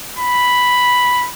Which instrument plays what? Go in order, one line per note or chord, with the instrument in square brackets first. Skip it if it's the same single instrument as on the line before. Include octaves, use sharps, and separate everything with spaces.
[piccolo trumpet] B5